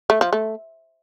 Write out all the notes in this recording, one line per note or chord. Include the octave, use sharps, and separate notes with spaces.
A3
F3
A3